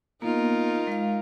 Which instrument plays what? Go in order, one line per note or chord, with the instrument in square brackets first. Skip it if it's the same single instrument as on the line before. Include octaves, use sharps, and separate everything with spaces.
[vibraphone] A#3 B3 [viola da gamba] D#4 F4 A#4
[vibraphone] G#3 F5